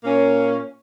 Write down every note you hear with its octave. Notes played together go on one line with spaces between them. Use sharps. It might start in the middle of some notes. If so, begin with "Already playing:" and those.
A#2 A#3 C#4